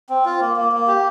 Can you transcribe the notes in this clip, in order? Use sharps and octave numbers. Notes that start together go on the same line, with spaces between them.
C4
F4
A#3
A#3
A#3
G4